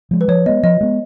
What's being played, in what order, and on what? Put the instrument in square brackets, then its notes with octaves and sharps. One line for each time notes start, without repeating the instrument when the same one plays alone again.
[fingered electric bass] F3 G#3
[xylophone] B4
[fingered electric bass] F3 [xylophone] C#5
[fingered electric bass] G#3 B3 [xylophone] D#5
[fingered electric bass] F3 [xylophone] D#5
[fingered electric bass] G#3 B3